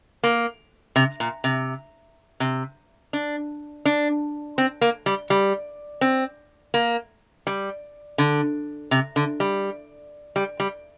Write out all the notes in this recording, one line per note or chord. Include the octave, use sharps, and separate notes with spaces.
A#3
C3
A#2
C3
C3
D4
D4
C4
A#3
G3
G3
C4
A#3
G3
D3
C3
D3
G3
G3
G3